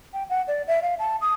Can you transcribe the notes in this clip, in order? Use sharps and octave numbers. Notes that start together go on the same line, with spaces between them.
G5
F#5
D5
E5
F5
A5
D#6